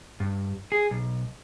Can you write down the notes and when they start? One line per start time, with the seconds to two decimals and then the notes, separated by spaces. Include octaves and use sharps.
0.20 G2
0.72 G#4
0.91 B1